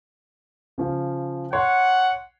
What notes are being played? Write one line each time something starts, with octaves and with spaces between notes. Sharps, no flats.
C#3 F3
C#5 F#5 C6